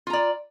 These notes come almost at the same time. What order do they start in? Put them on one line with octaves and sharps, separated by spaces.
F4 A#5 D5